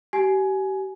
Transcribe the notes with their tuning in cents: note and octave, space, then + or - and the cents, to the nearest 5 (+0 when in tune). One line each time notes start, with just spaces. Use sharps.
G4 -35 G#5 +15